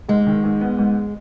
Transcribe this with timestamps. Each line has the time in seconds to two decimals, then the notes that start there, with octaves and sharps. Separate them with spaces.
0.09 G#2 G#3
0.27 D#3
0.44 G#2
0.61 B3
0.79 G#2